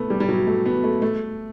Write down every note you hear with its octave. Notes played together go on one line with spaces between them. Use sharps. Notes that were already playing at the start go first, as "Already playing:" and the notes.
Already playing: A3 B3
G3
G3
F#3
A3
B3
A3
A3